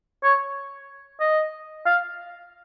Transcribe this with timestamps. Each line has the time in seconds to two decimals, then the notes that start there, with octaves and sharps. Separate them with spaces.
0.24 C#5
1.20 D#5
1.86 F5